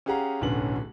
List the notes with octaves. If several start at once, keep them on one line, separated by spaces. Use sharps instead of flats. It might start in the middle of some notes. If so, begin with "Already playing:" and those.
C#4 G4 G#4 F5 F#5 A#5
D1 B1 D3 B3 C#4 F#7